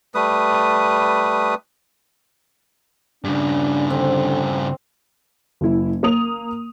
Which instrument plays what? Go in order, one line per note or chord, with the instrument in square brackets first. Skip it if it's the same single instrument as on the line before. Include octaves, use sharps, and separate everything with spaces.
[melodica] G3 A3 B4 D#6
[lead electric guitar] G2 C#3 [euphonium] D4
[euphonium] D3 [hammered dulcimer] C4
[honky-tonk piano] F#1 E4
A#3 D#6 F7